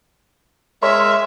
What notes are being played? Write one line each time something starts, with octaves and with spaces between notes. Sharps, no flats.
G#3 A#4 C#5 E5 C6